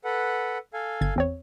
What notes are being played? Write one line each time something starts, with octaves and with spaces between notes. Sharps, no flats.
A4 B4 F#5
A4 F5 G#5
G1 G#6
E2 C4 C#5